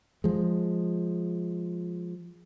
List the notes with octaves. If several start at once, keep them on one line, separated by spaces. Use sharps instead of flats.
F3 G#3